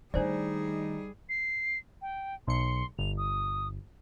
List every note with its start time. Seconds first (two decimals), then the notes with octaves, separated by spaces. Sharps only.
0.14 D#3 G3 A3 D4 D#4 G#4 C5 D5
1.29 C7
2.02 G5
2.48 B1 C6 C#7
2.99 G1 F7
3.18 D#6